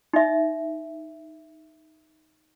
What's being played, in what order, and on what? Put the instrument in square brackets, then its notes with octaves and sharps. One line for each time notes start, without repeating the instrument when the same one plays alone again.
[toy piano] D#4 E5